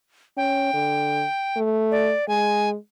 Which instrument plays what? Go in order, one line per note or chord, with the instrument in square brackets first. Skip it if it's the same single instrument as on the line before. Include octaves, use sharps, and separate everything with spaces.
[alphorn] C#4 [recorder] G5
[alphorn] D3
A3
[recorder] D5
[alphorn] G#3 [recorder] G#5